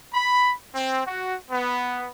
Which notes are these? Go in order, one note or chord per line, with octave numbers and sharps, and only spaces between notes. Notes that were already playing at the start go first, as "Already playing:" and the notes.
B5
C4
F#4
B3